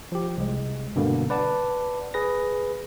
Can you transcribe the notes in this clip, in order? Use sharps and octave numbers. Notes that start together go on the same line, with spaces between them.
F3 G4
C2 G#3
G2 B2 D3 A#3
B4 D5 F#5 A5
G#4 B4 A#6